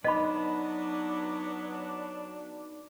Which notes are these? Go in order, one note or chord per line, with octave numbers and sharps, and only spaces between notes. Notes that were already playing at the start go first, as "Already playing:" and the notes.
F#3 B3 D4 D#4 B4 D#5 B5